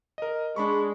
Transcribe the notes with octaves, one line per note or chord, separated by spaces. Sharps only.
A#4 D#5
G#3 D4 B5 C#6